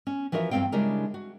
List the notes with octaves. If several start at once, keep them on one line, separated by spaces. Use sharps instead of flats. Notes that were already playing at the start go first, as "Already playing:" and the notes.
C#4
E3 F3 F#4 A#4 D#5 E5
E2 G2 A#3 C4 F5 G5
C#3 G3 G#3 D4 E4 A#4
F#4